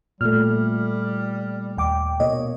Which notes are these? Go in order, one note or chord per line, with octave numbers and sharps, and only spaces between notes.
A#2 G3 A3 F6
D#2 G5 D6
B2 A#3 C#5 D#5